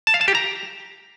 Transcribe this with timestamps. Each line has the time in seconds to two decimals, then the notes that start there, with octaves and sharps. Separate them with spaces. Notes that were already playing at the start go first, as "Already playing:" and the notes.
0.07 A5
0.14 F5
0.21 A5
0.28 G4
0.35 A#5